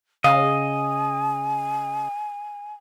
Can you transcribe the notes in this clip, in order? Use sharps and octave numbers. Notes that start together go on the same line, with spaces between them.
C#3 D#5 F5 G#5